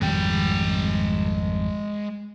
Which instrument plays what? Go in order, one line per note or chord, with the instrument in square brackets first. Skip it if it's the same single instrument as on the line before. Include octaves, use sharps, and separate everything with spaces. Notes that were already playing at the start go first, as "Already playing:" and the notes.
[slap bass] G#1 F2 G3 [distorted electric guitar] G#3 G5